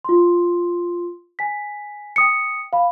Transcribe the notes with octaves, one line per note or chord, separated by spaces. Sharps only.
F4 C6
G#5 B6
G5 D#6 C#7
F5 B5